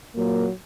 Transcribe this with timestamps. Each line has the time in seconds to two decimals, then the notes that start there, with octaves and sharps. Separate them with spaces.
0.15 A#2 F#3 A#3